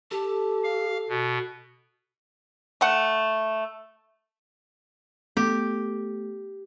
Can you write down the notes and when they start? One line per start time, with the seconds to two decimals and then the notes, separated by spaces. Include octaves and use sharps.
0.11 G4 A4
0.64 F5
1.09 B2
2.81 A3 F#5
5.37 A3 B3 G4 A4